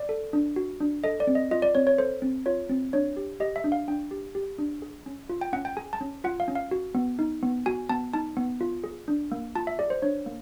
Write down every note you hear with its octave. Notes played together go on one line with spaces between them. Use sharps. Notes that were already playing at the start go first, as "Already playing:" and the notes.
Already playing: D5
A4
D4
F#4
D4
A4 D#5
D5
C4
D#5
F4 D#5
D5
C4 C#5
C#5
A4 C5
C4
F4 C#5
C4
D4 C#5
G4
G4 D#5
E5
D4
F5
D4 G5
G4
G4
D4
G#4
C#4
F4
G5
C#4 F#5
G5
G#4 G#5
A5
C#4
F4 F#5
F5
C#4
F5
F#4
B3
D#4
B3
F#4 G#5
B3 A5
D#4 A5
B3
F4
G#4
D4
A#3
F4 A5
E5
G#4 D5
C5
D4 C#5
A#3